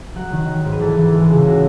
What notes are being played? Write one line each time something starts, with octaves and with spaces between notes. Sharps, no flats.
F#3 F#5
D#3
D#3
G#2
B4
E3 A4
E3
G#3
C#2
F#4